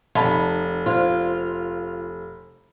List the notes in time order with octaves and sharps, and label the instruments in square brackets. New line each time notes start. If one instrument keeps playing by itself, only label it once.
[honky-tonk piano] F1 [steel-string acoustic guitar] D#4 [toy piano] F5 A5 B5
[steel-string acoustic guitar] F4 [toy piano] C5 D5